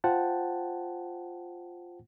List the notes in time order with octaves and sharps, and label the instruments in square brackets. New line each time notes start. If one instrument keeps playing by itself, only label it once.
[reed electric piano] F4 C5 F#5 G5 A5